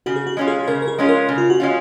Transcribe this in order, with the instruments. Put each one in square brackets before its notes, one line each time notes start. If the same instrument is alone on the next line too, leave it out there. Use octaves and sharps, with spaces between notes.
[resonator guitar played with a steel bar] C#3 [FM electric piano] F#4
[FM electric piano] G#4
F#4
[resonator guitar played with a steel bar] G#3 C#4 F4
[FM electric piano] G#4
[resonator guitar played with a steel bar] C#3 [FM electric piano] A#4
[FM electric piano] A#4
G#4
[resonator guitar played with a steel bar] G#3 C#4 F4
[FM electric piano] A#4
[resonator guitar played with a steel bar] C#3
[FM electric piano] F4
F#4
[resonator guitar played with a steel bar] G#3 C#4 F4